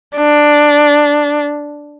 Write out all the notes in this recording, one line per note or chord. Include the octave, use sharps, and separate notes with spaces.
D4